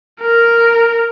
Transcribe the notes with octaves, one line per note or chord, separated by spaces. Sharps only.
A#4